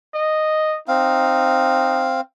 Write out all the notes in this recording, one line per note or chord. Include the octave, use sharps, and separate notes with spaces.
D#5
C4 D#4 F5